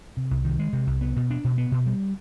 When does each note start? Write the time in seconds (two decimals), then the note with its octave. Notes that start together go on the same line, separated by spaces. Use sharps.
0.17 C3
0.31 C2
0.45 D#3
0.59 G#3
0.73 C3
0.87 C2
1.01 B3
1.16 B2
1.30 D4
1.44 B2
1.58 B3
1.72 B2
1.86 G3